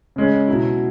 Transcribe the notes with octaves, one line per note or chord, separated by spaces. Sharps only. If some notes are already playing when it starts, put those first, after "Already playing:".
C#3 G#3 C#4
B2 F#3 E4